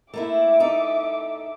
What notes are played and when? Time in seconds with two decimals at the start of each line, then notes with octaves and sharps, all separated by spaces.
0.14 A3 A#3 E4 E5 D6
0.60 D#4 A4